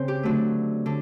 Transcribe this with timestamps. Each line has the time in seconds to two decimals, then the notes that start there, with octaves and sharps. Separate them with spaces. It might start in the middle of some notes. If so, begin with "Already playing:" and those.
Already playing: C#3 C4 C5
0.08 G4
0.23 D3 F#3 A3
0.86 D3